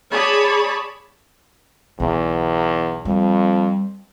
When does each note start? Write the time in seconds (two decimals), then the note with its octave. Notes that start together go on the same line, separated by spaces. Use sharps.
0.12 G#4 C#5 D5 A5 B5
2.00 B1 E2
3.05 F2 G3